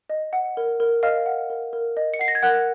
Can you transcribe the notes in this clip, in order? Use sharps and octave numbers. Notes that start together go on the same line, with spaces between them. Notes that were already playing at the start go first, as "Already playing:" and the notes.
D#5
F#5
A#4
A#4
D#5 F5 F6
F#5
A#4
A#4
D#5
C#7
F#5 C7
A#6
G#6
A#4 F#5 F#6